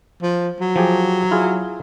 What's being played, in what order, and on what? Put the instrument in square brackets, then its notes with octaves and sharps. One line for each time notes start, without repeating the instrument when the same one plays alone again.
[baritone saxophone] F3
F#3
[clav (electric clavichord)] F3 G4 G#4
E4 F4 G#4